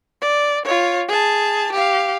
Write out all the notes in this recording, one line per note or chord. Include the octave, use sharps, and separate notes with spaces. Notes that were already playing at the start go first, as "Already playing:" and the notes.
D5
F4 C#5
G#4 A5
G4 F5